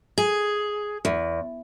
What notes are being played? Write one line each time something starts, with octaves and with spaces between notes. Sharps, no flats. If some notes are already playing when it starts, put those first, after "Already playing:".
G#4
E2